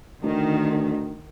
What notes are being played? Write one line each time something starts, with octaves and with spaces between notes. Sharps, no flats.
D2 D#3